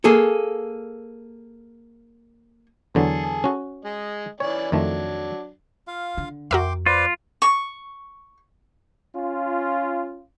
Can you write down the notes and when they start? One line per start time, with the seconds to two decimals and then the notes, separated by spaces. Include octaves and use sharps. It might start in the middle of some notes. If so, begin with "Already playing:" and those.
0.04 A#3 G#4 A4
2.95 E2 D3 F#3 G#4 A4
3.44 C#4 F#4
3.84 G#3 D#5
4.40 E3 C#4 C#5 D5
4.72 F2 D#3 F#3 A3 D4
5.88 F4 F5
6.17 D3
6.51 F2 F#4 A#4 E5 G5 C6 D6
6.86 F4 B4 C5 D5
7.42 C#6
9.14 C#4 F4